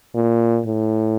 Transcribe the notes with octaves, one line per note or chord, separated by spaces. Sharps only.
A#2
A2